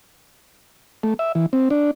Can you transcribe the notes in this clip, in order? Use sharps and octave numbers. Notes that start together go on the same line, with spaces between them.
A3
E5
E3
C4
D4